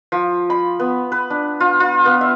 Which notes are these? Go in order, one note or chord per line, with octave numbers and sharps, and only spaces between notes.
F3
B5
B3
B4
D4
F4
F4
B3
E5